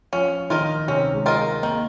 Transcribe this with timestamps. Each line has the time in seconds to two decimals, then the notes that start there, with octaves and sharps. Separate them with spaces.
0.13 F3 C#4 F4
0.50 D#3 D#4 F4 A#4 D#5
0.87 C3 C4 C#4
1.13 G#3
1.26 F4 A#4 D#5
1.38 G#3
1.63 D#3 A#3